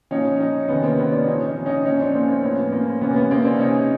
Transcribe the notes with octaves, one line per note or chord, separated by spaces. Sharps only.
A#2 F3 C#4 D#4
C#4 D#4
C3 D#3 B3 C#4
A#3 C4
B3 C#4
C4 D4
A#2 F3 C#4 D#4
C#4 D#4
C#4 D#4
A#2 F3 C#4 D#4
C4 D4
A#3 C4
A#3 C4
A2 F3 B3 C#4
A#3 C4
C3 E3 B3 C#4
A#3
B3
A#3 C4
C4 D4
C3 E3 C#4 D#4